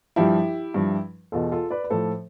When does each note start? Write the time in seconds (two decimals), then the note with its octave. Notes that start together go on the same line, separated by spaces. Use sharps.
0.16 G2 F3 E4 G4
0.74 G2 F3
1.32 E2 B2 F4 A4
1.52 F4 A4
1.70 B4 D5
1.84 B4
1.90 A2 F3 A4 C5